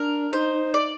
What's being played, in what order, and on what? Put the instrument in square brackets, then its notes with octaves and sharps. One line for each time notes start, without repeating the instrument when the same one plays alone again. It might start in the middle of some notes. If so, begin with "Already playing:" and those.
Already playing: [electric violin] D4 [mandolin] A#4
[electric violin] D#4 [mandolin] C5
[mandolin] D5